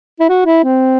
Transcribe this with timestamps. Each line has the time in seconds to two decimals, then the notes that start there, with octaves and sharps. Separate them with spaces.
0.20 E4
0.29 F#4
0.46 E4
0.64 C4